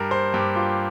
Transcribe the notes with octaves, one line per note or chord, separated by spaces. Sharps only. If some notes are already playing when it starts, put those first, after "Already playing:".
Already playing: G2 A#4
C5
G2 G4
F4